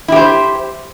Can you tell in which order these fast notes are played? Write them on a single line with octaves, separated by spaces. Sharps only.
E4 G4 C5